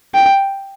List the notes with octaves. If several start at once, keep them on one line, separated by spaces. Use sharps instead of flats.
G5